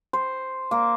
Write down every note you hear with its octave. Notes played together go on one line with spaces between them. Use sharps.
C5
A#3